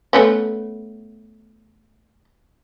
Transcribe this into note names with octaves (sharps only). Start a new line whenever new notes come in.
A3 B3 C#4